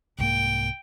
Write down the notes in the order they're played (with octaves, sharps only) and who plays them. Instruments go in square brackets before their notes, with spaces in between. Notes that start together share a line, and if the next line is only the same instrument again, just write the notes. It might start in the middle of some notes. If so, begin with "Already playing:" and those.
[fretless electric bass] C2 G#2 A#3 [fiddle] G5